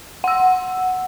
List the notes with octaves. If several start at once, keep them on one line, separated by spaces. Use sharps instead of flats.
F#5 E6